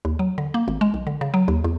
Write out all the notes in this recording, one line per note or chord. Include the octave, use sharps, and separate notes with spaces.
D#2
F#3
D3
A#3
G#1
G#3
B1
D3
C#3
F#3
D#2
E2